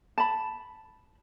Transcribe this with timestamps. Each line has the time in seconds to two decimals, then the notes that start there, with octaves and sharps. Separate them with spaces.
0.18 A5 B5